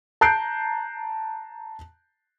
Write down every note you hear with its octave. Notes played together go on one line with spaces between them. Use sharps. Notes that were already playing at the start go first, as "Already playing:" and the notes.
A5 A#5 F#6 G6 C7 D7